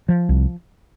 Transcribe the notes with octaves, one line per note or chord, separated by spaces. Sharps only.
F3
C2